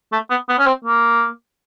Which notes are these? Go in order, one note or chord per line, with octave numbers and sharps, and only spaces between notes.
A3
B3
B3
C#4
C4
A#3